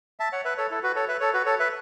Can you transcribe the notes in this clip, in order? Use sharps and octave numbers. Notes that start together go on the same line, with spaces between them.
E5 A5
C#5 F#5
B4 E5
A4 C#5
E4 A4
F#4 B4
A4 C#5
B4 E5
A4 C#5
F#4 B4
A4 C#5
B4 E5